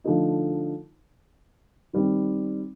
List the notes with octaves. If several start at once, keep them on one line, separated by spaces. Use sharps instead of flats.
D3 F3 A3 D#4
D#3 G3 C4